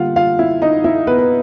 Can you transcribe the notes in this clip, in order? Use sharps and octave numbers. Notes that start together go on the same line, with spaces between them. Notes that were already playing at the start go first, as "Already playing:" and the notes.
Already playing: D3 G3 A#3 F4 F5 F#5
F4 F5
E4 E5
D#4 D#5
E4 E5
B3 B4
B4